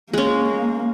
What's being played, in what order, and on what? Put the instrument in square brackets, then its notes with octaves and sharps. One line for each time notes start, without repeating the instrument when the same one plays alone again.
[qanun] G#3 C#4 [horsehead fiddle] A#3